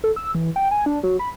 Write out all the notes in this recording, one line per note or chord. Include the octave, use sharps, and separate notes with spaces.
A4
E6
E3
G5
G#5
D4
F#3
B5